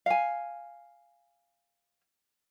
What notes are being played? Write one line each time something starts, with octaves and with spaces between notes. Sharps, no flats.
F5 G#5